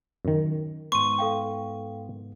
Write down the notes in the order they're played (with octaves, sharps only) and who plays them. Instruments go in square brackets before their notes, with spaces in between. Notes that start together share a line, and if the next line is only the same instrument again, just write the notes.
[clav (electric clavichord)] F#2 D#3
[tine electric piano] G#2 B3 [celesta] C6 D#7 [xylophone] C#6
[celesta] A4 F5 G5